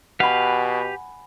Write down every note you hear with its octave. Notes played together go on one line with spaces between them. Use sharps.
B2 G4 B4 F5 F#5 G#5 B5